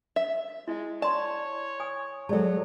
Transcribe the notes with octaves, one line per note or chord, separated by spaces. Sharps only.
E5
G#3 E4
C#5 D5 A5 C6
G#5 D#6
F#3 G#3 A4 D5 A5